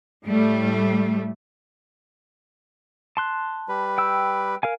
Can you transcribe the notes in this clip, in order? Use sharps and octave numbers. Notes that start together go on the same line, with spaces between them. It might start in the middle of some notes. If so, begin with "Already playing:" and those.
A2 G3 A3
A5 C6 F#6
G3 B4
G5 E6
A#4 F5 G#5